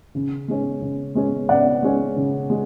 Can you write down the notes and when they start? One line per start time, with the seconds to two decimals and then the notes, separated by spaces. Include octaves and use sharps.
0.15 C#3
0.48 G#3 C#4
0.82 C#3
1.15 G#3 C#4
1.49 C#3 D5 F#5
1.83 G#3 C#4
2.16 C#3
2.50 G#3